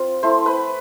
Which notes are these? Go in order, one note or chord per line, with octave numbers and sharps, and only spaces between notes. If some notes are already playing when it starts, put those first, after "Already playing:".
Already playing: C4 F4
A3 E4 C5 C6
B4 B5